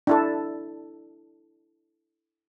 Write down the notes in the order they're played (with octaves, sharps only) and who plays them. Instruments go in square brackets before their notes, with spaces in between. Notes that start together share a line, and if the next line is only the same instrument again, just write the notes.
[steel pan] D4 E4 A4